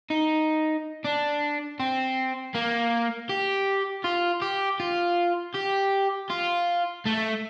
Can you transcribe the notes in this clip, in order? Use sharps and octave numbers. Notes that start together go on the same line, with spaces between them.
D#4
D4
C4
A#3
G4
F4
G4
F4
G4
F4
A3